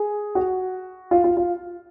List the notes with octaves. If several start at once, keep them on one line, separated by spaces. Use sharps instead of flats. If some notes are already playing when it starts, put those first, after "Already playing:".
Already playing: G#4
F#4
F4
F4
F4